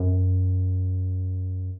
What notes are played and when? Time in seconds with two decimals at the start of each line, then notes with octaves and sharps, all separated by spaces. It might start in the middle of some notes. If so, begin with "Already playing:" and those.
Already playing: F#2